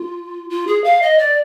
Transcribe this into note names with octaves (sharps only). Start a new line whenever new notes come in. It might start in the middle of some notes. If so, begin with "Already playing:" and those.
Already playing: F4
F4
G#4
F5
D#5
D5